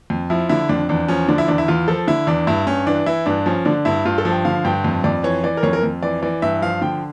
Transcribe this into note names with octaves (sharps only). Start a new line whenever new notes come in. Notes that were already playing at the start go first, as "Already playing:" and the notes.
F2
F3 E4
D3 E4
F2 D4
E2 D4
F3 C#4
D3 D4
E4
E2 D4
E4
E2 F4
F3 A4
D3 E4
E2 D4
G2 E4
G2 C#4
E3 D4
E3 E4
G2 D4
F3 C#4
D3 D4
G2 E4
G2 F4
A4
F3
G5
D3 F5
G2 G5
F2
F2 D5
E3 C#5
E3 D5
A#4
F2 C#5
A#4
F2
E3 D5
E3 D5
G2 E5
F3 F5
D3 G5